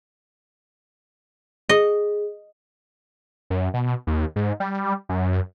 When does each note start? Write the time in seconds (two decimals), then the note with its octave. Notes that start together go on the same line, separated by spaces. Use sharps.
1.69 G#4 D#5
3.50 F#2
3.74 B2
4.07 D#2
4.36 G#2
4.60 G3
5.09 F#2